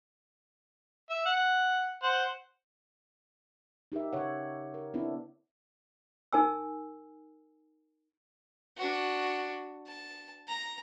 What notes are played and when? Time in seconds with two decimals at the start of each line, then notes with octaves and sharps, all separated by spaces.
1.10 E5
1.25 F#5
2.03 C5 F#5
3.92 D#4 G4 A#4 E5
4.13 C#3 C#5 F#5
4.74 A#4
4.94 B3 C4 D4 E4
6.33 D#4 A#4 G#5 E6
8.77 D4 F#4
9.87 A5
10.47 A#5